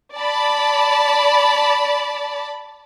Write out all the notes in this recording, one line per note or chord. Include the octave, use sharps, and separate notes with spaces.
D5 A5 B5